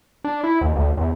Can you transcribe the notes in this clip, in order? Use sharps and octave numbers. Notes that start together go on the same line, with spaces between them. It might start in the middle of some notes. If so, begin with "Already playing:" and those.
D4
E4
D#2
D2
E2